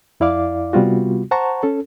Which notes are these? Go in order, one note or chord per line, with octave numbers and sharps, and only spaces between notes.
F2 E4 D5 F5 D6
C3 G3 B3 F4 F#4
C5 F#5 A5 A#5 C#6
C#4 A4